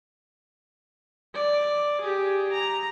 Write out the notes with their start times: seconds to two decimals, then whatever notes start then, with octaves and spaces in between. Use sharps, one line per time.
1.35 D5
2.01 G4 G#4
2.52 A#5